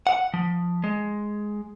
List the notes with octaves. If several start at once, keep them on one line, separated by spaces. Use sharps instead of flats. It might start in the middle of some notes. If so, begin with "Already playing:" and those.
F#5
F3
G#3